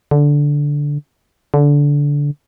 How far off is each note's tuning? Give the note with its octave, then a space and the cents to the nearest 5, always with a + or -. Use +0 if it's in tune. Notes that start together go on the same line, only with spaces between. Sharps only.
D3 -10
D3 -20